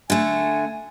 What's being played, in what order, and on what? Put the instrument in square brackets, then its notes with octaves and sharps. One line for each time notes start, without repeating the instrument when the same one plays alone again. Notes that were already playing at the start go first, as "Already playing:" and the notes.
[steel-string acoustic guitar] D3 A3 [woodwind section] G#5